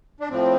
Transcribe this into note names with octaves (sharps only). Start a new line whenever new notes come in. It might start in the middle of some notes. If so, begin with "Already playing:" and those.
D4
A2 F3 C4